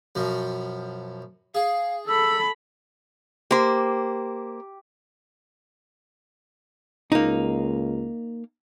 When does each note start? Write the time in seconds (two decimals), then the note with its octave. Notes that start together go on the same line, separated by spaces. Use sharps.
0.15 F#2 B2 F3
1.55 G#4 F5
2.07 A4 B5 E6
3.51 A#3 G4 C5
7.12 C#2 A#3 D#4